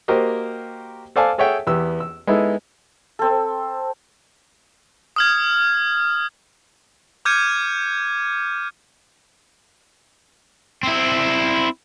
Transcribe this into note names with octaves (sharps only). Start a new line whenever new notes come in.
A#3 F#4 G4 A#4 C5 D#5
A4 C5 D5 F5 G#5 A5
G#4 A4 C#5 E5 F#5 G5
E2 B3 G4 E6
E6
G#3 B3 D#4 E4 A4
C4 A4
D#6 F6 G#6
D6 F6 G6 G#6 C#7 D#7
C4 E4